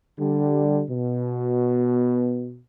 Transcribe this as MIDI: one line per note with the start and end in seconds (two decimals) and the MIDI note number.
0.19 0.83 50
0.19 0.83 55
0.90 2.61 47